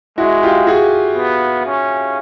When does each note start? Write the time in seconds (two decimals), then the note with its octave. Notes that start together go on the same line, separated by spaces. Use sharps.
0.18 G#3 E4 F#4
0.42 F4 G4
0.67 F#4 G#4
1.17 B3
1.66 C#4